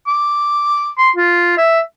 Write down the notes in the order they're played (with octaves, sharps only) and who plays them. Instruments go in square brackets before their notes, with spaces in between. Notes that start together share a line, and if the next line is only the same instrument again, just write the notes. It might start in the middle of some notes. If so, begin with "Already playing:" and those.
[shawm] D6
C6
F4
E5